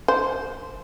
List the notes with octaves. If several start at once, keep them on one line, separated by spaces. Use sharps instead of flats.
C5